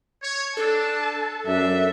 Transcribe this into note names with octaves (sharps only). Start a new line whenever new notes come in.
C#5
D4 A4 A5
F#2 D4 E5